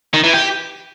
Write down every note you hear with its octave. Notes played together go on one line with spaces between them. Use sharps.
D#3
E3
G4